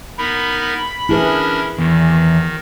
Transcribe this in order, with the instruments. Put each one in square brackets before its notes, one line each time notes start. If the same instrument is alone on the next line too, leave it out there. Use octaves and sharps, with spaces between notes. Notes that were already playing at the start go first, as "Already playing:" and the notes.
[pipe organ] B3 D#4 A#4 [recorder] B5
[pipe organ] C#4 D4 A#4 [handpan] E4 G#4 B4
[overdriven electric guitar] E2 [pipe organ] D#3